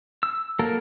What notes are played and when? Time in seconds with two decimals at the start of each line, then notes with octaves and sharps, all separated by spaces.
0.23 E6
0.59 F#3 A#3 A4 A#4